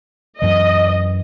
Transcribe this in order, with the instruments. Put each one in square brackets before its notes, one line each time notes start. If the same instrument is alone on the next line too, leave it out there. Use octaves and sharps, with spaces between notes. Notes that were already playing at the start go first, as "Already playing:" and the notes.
[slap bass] F#2 E3 [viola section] D#5